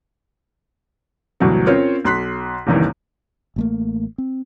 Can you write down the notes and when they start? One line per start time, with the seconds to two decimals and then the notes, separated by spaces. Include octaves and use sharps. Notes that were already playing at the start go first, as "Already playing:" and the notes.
1.40 D2 G2 B2 E3 F#3
1.67 C4 C#4 F4 A#4 C5 C#5
2.05 B1 C6 F#6 B6
2.67 F#1 C2 D#3 E3
3.56 A1 A3 A#3
4.18 C4